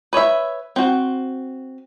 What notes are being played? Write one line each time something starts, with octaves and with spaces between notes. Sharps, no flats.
B4 C#5 D#5 E5
C4 F#4